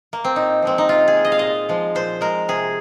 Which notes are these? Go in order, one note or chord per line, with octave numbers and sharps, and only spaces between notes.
A#3
C4
A#2 D#4
F3 G#3 C4
D#4
C3 F4
G#4
G#3
D#5
F5
A#2 D#5
F3 G#3
A#2 C5
G#3 A#4
C3 G#4